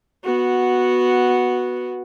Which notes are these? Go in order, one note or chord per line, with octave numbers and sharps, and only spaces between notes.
B3 F#4